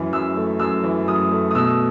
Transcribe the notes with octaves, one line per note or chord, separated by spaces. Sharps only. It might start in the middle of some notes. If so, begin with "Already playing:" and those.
Already playing: F#2 E3
F#2 E6
A3
F#2 E6
E3
F#2 D#6
A3
D#6
B2 E6